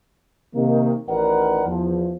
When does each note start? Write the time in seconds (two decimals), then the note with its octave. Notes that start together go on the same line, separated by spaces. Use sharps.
0.54 C3 D#3 A#3
1.07 A1 D#3 A#4 B4 D5 F#5
1.66 E2 F3